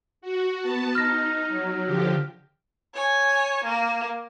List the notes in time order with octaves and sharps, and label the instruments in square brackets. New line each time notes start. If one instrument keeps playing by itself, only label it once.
[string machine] F#4
B3 A5
[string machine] D#4 [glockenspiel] F6 A#6
[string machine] F#3
D3 F3 G4
[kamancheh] C#5 G#5
A#3